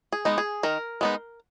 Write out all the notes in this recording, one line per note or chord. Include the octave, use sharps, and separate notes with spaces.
G#4
G#3 B3 D#4
G#4
D#3 A#4
G#3 B3 D#4